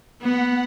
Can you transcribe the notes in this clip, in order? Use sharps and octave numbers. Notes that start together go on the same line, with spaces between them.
B3 F#5